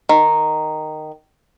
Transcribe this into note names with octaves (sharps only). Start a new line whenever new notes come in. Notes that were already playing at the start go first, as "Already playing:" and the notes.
D#3